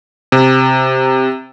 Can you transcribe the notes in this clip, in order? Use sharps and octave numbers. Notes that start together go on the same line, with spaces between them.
C3